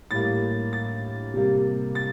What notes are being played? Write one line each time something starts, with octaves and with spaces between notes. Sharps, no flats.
A2 G3 A#3 A6
A6
C3 G3 A#3
A6